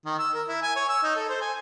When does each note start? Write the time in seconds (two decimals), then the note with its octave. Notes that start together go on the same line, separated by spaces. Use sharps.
0.05 D#3
0.19 E6
0.34 A#4
0.48 E4
0.62 G#5
0.76 C#5
0.89 E6
1.03 D#4
1.16 A4
1.29 C5
1.41 G#5